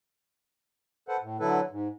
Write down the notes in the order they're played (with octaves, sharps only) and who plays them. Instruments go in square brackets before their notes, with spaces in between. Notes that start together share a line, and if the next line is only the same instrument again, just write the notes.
[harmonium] A4 B4 C5 F#5
A2
D3 F#3 E4 A4 B4
G#2